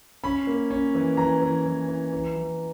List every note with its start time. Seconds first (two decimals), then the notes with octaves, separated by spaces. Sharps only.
0.24 C#4 B5
0.47 A#3
0.71 C#4
0.95 E3
1.17 E3 A#5
1.42 E3
1.66 E3
1.88 E3
2.12 E3
2.36 E3